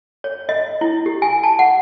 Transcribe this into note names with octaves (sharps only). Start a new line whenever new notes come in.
C#5
D#5
E4
G4
G#5
A5
F#5